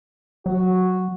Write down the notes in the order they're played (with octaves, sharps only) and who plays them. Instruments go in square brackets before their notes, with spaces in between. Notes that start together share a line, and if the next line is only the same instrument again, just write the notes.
[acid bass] F#3 [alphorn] F#4